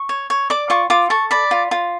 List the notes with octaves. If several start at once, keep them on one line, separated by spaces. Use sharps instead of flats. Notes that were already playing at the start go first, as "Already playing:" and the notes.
Already playing: C#6
C#5
C#5
D5 D6
F4 C#6
F4 D6
A4 C#6
D5 B5
F4
F4